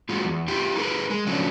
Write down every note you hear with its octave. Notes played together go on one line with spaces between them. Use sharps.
G#2 G#3 F4 F#4
E2
E4 F4 G4
D#4 G#4 A#4 B4
G#3
C#3 F3 F#3 A3 C#4 D4